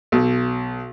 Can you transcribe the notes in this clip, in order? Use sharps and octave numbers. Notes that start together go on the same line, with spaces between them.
B1